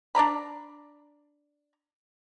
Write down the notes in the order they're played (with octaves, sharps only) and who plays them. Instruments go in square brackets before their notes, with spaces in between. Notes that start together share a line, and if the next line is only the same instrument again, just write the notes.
[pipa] D4 D5 A#5 B5